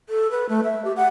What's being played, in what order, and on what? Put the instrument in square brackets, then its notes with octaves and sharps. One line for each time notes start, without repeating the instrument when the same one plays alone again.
[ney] A4
B4
A3
E5
G4
F#5